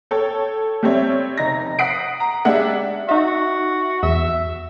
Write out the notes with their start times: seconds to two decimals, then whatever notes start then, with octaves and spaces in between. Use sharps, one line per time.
0.11 A4 C#5 G5
0.83 G3 C4 C#5 E5
1.38 F1 D#4 A#6
1.79 F#5 D#6 B6 C7 D7
2.20 A#5
2.45 G#3 D4 G4 E5 F#5
3.09 D#4 F#4 E5
4.03 E2 E5